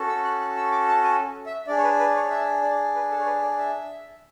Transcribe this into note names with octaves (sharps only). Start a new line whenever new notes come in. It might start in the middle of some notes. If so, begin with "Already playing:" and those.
Already playing: C#4 F#4 A4
E6
F#6
F#6
E6
D6
A5
G#5
E5
D4 G#4 D5
C#5
B4
B4
C#5
E5
D5
B4
A4
C#5
B4
D5
E5